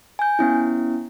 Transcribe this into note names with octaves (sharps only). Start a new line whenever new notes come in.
G#5 G6
B3 C#4 E4